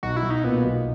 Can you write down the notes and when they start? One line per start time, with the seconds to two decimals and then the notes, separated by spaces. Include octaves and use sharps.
0.03 B1 F#4
0.16 E4
0.23 B1
0.30 D#4
0.44 A#2 B3
0.65 B1